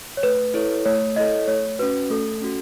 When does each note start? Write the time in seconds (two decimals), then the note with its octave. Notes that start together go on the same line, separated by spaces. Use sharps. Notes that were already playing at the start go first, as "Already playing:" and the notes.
0.17 C#5
0.23 A3 B4
0.54 E4 A4 C#5
0.85 A3 C#5
1.16 E4 A4 C#5 D#5
1.48 A3 C#5
1.79 C#4 F#4 B4
2.10 A3 A4
2.41 C#4 F#4